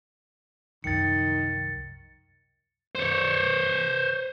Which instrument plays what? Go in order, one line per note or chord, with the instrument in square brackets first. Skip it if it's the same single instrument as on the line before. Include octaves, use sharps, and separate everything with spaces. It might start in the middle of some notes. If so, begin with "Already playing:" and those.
[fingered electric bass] C2 F#2 F3 [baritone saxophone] D#3 [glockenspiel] A6 C#7
[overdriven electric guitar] C5 C#5